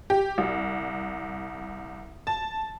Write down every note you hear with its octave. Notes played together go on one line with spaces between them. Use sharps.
G4
C2
A5